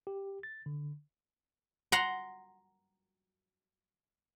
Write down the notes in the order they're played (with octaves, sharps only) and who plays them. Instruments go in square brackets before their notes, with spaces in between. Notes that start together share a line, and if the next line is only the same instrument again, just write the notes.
[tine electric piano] G4
A6
D3
[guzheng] F#5 A#5 C6